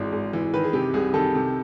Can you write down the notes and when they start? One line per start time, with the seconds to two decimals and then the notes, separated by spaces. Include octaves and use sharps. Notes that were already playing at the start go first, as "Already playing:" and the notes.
Already playing: G#1 G#2 E3
0.12 G#1
0.33 E3
0.54 D#3 B4
0.64 G#4
0.73 C3 G4
0.94 C2 G#4
1.14 D#3 A4
1.35 C3